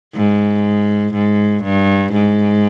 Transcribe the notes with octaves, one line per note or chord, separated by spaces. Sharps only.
G#2
G#2
G2
G#2